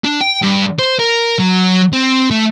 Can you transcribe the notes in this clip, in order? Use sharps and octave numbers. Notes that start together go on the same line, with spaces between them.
D4
G5
G2
C5
A#4
F#3
C4
A3